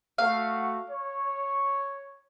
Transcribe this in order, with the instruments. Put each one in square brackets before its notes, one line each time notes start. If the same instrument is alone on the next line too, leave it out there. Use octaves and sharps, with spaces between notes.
[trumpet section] A3 F#4 [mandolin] F5
[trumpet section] C#5